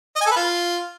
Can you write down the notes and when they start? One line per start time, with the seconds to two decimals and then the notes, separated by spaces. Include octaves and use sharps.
0.16 D#5
0.21 G#5
0.26 A4
0.31 B4
0.36 F4